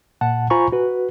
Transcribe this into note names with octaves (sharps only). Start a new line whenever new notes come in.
A#2 F#5 A5
F4 C5 G#5 A#5 B5 C#6
F#4 B4